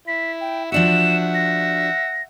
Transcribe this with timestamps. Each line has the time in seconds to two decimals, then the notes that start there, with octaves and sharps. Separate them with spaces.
0.08 E4 B6
0.41 G5
0.72 F3 D4 F#4 E5 F#5 E7
1.34 A#6